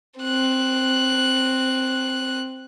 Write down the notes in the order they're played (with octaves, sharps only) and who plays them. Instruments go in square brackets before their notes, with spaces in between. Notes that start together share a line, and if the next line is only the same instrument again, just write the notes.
[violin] C4 F#6